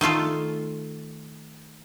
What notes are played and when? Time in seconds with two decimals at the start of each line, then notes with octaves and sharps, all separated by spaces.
0.01 D#3 A3 F4 A4